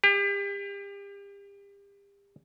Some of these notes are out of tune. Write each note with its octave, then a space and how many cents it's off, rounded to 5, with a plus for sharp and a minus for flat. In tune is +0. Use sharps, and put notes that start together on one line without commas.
G4 +35